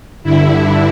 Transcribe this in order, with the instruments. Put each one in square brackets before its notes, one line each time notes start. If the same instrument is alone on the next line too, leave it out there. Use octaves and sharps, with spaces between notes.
[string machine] G2 D3 E4